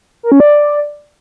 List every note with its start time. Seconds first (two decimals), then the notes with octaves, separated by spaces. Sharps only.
0.23 A#4
0.32 C#4
0.40 D5